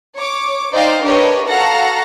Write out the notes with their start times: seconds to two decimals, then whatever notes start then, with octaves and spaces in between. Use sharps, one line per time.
0.16 C#5 D6
0.73 D#4 C5 D5 D#5 F5 G5
1.03 D4 G4 A#4 B4 C#5 D#5
1.49 F#4 A4 F5 F#5 A#5 A#6